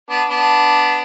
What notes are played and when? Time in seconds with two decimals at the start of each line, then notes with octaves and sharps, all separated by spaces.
0.10 B3 D4
0.29 B3 D4